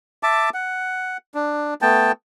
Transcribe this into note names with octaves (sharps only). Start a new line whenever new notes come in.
E5 A5 D6
F#5
D4
A3 B3 G5 A5